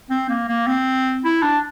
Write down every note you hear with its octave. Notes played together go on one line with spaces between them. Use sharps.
C4
A#3
A#3
C4
E4
D4